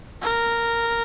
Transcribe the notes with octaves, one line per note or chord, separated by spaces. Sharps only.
A#4